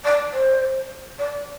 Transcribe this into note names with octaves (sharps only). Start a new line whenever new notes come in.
D5
C5
D5